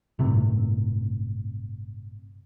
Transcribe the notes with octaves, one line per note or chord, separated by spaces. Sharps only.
G1 A2 C3